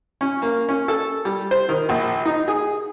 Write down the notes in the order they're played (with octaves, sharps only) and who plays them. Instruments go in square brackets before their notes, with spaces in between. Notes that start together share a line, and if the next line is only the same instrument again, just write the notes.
[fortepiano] C#4
A#3
C#4
A4
G3
C5
D#3
A#1
D#4
G#4